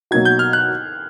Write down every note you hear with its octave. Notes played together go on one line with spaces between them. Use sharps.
B2 F#3 A#3 D#4 F#4 G#6
G6
F6
F#6